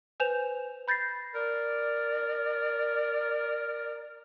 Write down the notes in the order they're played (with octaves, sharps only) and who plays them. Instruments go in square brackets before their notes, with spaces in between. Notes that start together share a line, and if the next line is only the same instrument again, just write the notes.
[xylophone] B4 C5 G#5 G6 E7 F7
B5 G6 A6 A#6 C7
[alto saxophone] A#4 [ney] D5